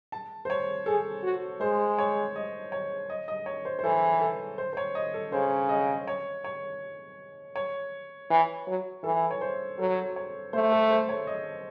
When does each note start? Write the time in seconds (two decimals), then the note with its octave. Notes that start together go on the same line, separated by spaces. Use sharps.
0.12 A5
0.45 C5
0.50 C#5
0.86 G#4 A4
1.23 F#4
1.61 G#3 C5
1.98 C#5
2.36 D#5
2.72 C#5
3.10 D#5
3.28 D#5
3.46 C#5
3.65 C5
3.79 C5
3.84 E3 A4
4.21 A4
4.58 C5
4.73 C5
4.77 C#5
4.95 D#5
5.14 A4
5.32 C#3 C5
5.69 D#5
6.07 C#5
6.44 C#5
7.56 C#5
8.30 E3
8.67 F#3
9.04 E3 A4
9.31 C#5
9.41 C5
9.79 F#3 A4
10.16 C#5
10.53 A3 C5
10.71 A4
10.90 C5
11.09 C#5
11.27 D#5